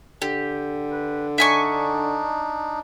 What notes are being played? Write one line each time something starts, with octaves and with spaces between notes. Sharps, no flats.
D3 G4
B4
D4 D#4 E5 G#5 C#6